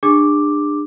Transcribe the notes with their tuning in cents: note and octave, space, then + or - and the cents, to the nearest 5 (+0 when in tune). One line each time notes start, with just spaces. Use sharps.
D4 +25 G#4 -40 D6 +0